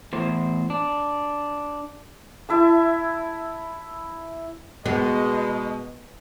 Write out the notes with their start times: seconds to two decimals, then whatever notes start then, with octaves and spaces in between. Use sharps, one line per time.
0.13 E2 A2 C5
0.70 D4
2.49 E4 E5 A5
4.86 B2 G#3 B3 D#5